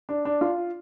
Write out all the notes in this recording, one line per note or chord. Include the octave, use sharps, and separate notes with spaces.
D4
D4
F4